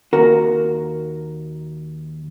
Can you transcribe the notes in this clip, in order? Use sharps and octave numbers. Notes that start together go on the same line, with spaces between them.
D#2 F#4 A#4